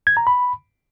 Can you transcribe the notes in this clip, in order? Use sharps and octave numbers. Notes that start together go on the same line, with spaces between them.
G#6
A#5
B5